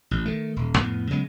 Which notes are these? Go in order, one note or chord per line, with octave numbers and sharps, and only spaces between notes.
A1
D#3 A3
D#1
F2 A2 B3
C#3 F#3 G#3 B3